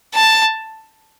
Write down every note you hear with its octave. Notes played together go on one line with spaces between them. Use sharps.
A5